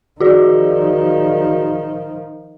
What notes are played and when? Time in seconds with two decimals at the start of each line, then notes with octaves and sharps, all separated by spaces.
0.21 D#3 F3 F#4 G#4 D5